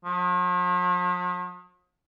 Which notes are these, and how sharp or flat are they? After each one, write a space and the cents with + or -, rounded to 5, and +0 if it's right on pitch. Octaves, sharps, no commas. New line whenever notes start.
F3 +45